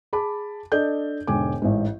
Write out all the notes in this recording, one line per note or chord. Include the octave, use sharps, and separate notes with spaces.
G#4 A5 B5 D6
D4 A4 D5 D#5 G6
E1 G#2 D3 G5 G#5 D6
A1 G#2